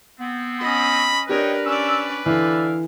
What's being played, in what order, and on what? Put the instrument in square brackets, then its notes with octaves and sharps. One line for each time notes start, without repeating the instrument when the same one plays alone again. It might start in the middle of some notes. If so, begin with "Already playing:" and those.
[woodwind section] B3 C4
[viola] C#4 D#5 [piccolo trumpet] B5
[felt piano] D4 G4 [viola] A#4 [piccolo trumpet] B4 [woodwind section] C#5 D#5 G5
[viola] C#4 D5 [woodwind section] E6
[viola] D3 [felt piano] E3 [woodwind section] D5 E5 F5